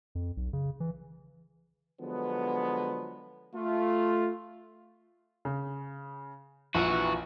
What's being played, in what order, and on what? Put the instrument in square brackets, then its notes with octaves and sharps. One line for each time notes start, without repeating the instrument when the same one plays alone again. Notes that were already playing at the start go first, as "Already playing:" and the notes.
[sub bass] F2
B1
C#3
E3
[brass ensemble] D3 F3 F#3 G#3 B3
A3 F4
[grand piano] C#3
[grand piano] A#1 F3 [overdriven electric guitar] E3 F#4